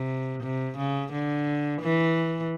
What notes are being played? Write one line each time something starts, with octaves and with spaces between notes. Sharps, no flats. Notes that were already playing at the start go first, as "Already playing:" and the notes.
Already playing: C3
C3
C#3
D3
E3